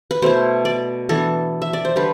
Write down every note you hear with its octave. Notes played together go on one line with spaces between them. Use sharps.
B4
B2 A3 E4 C5
D5
E3 B3 D4 A4
E5
D5
C5
D3 G3 D4 B4